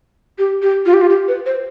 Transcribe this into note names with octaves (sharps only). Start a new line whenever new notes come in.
G4
G4
F4
G4
F4
G4
B4
C5